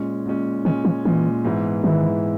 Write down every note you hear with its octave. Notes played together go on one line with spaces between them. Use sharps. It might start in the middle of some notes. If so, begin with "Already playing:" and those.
Already playing: A#2 G#3 C#4
A#2 G#3 C#4
A#2 D#3 G#3 C#4
E3
A#2 E3 G#3 C#4
G#2 E3 B3 E4
G#2 D#3 E3 B3 E4